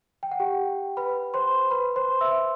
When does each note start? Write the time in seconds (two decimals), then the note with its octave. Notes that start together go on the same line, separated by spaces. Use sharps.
0.23 G5
0.31 F#5
0.40 G4 G5
0.97 B4 B5
1.34 C5 C6
1.71 B4 B5
1.96 C5 C6
2.21 E5 E6